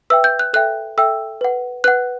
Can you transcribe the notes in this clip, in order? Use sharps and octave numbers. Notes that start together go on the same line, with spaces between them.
B4 E5 G5 E6
G6
F#6
A4 E5 G5 F#6
A4 E5 G5 E6
B4 F#5
B4 F#5 F#6